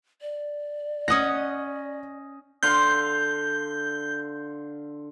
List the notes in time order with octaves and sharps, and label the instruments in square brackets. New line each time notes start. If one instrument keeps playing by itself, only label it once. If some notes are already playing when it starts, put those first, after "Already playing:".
[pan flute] D5
[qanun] C#4 D#5 F#5 [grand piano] D#6 A#6
[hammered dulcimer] D3 F5 C6 [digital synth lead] G6